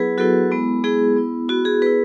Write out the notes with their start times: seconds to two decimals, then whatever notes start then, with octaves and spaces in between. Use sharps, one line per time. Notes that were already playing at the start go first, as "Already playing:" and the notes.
Already playing: F#3 B3 E4 G#4 B4
0.18 F#3 B3 E4 F#4 A4
0.51 G#3 B3 E4
0.84 G#3 B3 E4 G#4
1.17 B3 E4
1.49 B3 E4 F#4
1.65 G#4
1.82 B3 E4 G#4 B4